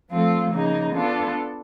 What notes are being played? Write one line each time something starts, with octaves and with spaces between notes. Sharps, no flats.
F3 A3 C4 F4 A4
C#3 F3 A#3 D#4 G#4
B3 D4 F4 A4 D5